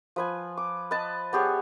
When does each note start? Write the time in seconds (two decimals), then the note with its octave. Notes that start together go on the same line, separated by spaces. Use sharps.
0.16 F3 B4 G#5
0.57 D6
0.91 B4 D#5 A5
1.33 B3 G4 G#4 C#5